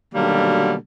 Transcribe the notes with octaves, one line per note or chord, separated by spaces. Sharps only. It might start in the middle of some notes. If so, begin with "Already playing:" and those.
B2 D3 D#3 F#3 G3 A#3